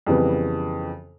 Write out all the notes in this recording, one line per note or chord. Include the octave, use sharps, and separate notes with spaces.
F2 C#3 E3 G3 B3